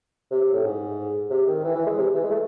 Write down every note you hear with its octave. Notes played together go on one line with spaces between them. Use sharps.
C3
C3
A2
G#2
C3
D#3
E3
E3
G#3
C3
E3
G#3
A3